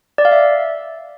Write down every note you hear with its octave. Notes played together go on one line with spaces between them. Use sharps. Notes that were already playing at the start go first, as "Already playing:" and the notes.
D5
F5
E5